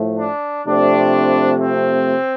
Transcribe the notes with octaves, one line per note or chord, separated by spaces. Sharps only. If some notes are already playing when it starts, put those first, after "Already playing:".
Already playing: A2 F3 A3
D4
C3 F3 A3 C4 D4
C4